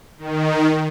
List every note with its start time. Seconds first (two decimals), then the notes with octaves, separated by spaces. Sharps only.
0.18 D#3